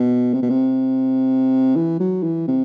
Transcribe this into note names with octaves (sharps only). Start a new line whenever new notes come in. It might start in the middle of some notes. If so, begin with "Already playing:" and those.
Already playing: B2
C3
B2
C3
E3
F#3
E3
C3